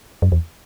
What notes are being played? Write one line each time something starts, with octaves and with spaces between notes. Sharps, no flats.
F#2
E2